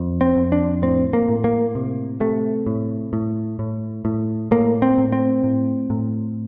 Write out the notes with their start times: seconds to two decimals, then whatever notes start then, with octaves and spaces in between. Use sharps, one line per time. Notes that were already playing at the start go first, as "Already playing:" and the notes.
Already playing: F2
0.21 C4
0.36 F2
0.52 D4
0.82 A2 C4
1.13 A#3
1.29 A2
1.44 A#3
1.75 C3
2.20 C3 A3
2.67 A2
3.13 A2
3.59 A2
4.05 A2
4.51 A2 A#3
4.82 C4
4.98 A2
5.12 C4
5.44 A2
5.90 A2